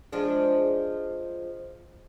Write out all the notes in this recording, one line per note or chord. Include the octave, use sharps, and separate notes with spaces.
F3 G#3 D4